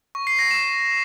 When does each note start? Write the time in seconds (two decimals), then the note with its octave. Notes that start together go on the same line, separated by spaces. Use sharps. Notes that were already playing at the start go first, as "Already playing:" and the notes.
0.15 C#6
0.27 C7
0.39 A#6
0.51 E7